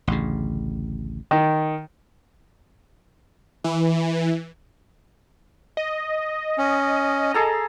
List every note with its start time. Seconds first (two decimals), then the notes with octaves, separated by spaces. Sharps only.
0.07 A1 D2 C#3
1.31 D#3
3.64 E3
5.77 D#5
6.58 C#4
7.34 G#4 A4 A#5